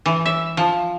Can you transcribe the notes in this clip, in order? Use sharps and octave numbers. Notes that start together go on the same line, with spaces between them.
E3
E5
F3